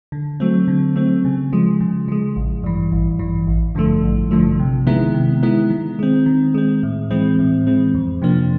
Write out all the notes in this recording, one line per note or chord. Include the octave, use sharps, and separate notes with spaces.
D3
F#3 A3 C4
D3
F#3 A3 C4
C#3
F3 G#3
C#3
F3 G#3
A1
G2 E3
A1
G2 E3
A1
G2 D3 F3 A3
A1
G2 D3 F3 A3
C3
D#3 G#3 B3 E4
C3
D#3 G#3 B3 E4
D#3
G#3 C4
D#3
G#3 C4
A2
E3 G#3 C4
A2
E3 G#3 C4
F2
C3 F3 A#3 D4